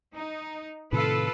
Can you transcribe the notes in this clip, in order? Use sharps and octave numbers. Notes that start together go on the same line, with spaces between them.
D#4
A2 C3 D#3 F4 A4 B4